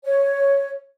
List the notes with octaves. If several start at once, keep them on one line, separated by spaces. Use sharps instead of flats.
C#5